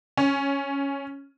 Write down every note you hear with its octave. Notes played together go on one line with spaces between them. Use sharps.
C#4